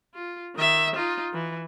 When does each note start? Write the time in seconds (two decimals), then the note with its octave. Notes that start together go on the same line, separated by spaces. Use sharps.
0.15 F4
0.56 D#3 E5
0.96 D#4 F4
1.33 E3